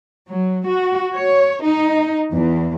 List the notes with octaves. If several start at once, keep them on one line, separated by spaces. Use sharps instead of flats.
F#3
F#4
C#5
D#4
E2